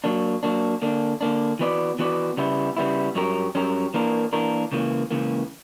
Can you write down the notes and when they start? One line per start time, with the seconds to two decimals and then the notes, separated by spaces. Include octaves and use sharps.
0.04 F#3 A#3 D4
0.43 F#3 A#3 D4
0.82 D3 A#3 D4
1.21 D3 A#3 D4
1.59 E3 B3 F#4 B4 D5
1.99 E3 B3 F#4 B4 D5
2.37 C#3 G3 B3 E4
2.77 C#3 G3 B3 E4
3.15 G2 F#3 C#4 G4 A#4
3.55 G2 F#3 C#4 G4 A#4
3.94 E3 A#3 D4 A#4
4.33 E3 A#3 D4 A#4
4.72 C#2 C#3 E3 A#3
5.11 C#2 C#3 E3 A#3